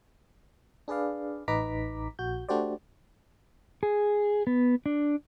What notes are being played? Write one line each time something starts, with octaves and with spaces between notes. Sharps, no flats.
D4 G#4 B4 D5 F5
A1 D#4 B4 A#5 D6 B6
A#1 F#4 G6
A3 D4 F#4 G4 C5 D5
G#4
B3
D4